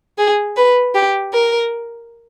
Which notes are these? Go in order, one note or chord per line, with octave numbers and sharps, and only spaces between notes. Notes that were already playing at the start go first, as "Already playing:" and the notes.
G#4
B4
G4
A#4